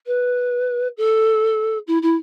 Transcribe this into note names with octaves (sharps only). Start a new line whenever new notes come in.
B4
A4
E4
E4